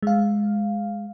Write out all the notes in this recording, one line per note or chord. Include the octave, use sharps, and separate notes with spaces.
G#3 F5